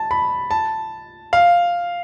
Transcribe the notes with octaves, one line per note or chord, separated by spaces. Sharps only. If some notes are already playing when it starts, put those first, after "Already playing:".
Already playing: A5
B5
A5
F5